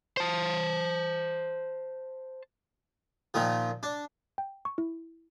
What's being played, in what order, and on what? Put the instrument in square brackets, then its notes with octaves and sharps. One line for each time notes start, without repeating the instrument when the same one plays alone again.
[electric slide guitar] C5 A5
[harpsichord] A#2 D#3 F3
D4
[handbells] G5
C#6
E4